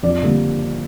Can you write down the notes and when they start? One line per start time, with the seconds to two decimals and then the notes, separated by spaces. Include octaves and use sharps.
0.03 F2 D5
0.22 D3 G3 A#3